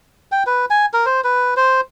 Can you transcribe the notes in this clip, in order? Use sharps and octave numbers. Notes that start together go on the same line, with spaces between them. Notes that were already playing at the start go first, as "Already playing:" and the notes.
G5
B4
G#5
A#4
C5
B4
C5